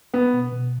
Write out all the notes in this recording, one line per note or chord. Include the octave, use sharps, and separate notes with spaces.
B3 B4
B2
B2